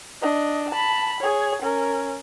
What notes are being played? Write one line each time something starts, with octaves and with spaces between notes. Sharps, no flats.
D4 D#5
A5 B5
G#4 C#5
C#4 A#4